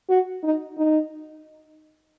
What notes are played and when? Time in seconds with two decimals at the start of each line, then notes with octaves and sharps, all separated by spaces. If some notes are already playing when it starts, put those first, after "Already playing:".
0.09 F#4
0.44 D#4
0.78 D#4